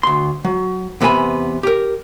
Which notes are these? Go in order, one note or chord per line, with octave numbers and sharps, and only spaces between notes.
D2 C6
F#3
E2 C3 B3 A#4 G#5 B5
G4 A#4